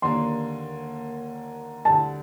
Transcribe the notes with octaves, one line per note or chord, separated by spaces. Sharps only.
D#2 D3 G3 A#3 D4 C6
D2 D3 G3 A5